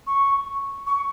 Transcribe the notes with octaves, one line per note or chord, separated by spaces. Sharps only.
C#6
C#6